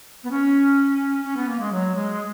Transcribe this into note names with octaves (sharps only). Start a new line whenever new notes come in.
B3
C#4
C#4
B3
A#3
G#3
F#3
G#3